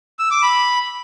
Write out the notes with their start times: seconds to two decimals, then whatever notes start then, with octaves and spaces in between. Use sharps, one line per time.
0.19 E6
0.31 D6
0.42 B5